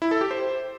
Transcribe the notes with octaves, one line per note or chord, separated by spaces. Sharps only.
E4
A4
G4
C5